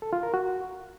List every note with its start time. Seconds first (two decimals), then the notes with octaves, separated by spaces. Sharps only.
0.02 A4
0.13 F4
0.23 A#4
0.34 F#4